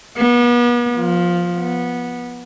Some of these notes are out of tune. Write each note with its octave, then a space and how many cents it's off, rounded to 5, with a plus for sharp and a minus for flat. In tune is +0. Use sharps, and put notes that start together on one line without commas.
B3 -40
F3 +5
B3 -15